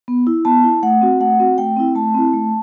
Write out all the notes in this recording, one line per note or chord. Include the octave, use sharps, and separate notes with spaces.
B3
E4
B3 A5
E4
A3 F#5
C4 F#4
A3 F#5
C4 F#4
A3 G5
C4 E4
A3 A5
C4 E4
A3